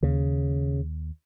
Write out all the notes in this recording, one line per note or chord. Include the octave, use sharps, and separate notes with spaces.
D#2 C#3